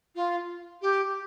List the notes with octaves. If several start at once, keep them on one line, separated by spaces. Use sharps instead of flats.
F4
G4